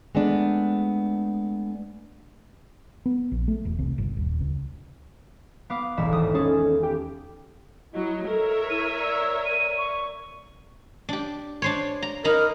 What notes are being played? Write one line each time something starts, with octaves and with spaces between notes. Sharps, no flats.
G#3 A3 B3 D4
B3
A#1
A3
E1
C2
G1
D#1
C#2
B3 F5 D6
E1 A1 E5
G#1 E2 D#6
G#3 C#4 G#4 A4
G4
F#3 E4 D#5
A4 A#4 C#5 E5
E4 D#7
D5 E6
D#7
C#6
D4 G4
D4 C5 C#5
A#5
D#4 A#4 A#5 B5